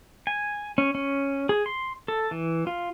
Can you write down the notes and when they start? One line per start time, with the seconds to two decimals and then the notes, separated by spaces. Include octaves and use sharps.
0.27 G#5
0.78 C#4
0.95 C#4
1.49 G#4
1.66 C6
2.08 A4
2.31 E3
2.67 F4